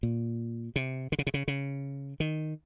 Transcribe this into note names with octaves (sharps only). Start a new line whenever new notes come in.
A#2
C3
D3
C#3
C3
C#3
C#3
D#3